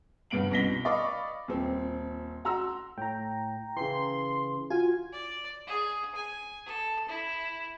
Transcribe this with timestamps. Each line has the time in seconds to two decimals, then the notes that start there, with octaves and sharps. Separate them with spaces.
0.30 G2 C#3 B3 D7 F#7
0.51 C2 B2 A#6 B6 G7
0.85 D5 D#5 F5 B5 C#6
1.48 D#1 C4
2.45 F#4 A#5 C6 E6
2.98 A2 G5 A#5
3.77 C#3 E3 C6
4.70 F4 F#4 F5 G#5
5.13 D5
5.67 G#4
6.15 G#5
6.65 A4
7.08 E4